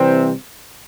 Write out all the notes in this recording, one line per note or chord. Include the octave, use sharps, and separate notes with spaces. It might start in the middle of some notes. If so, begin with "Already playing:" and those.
Already playing: C3 E3 G3 C4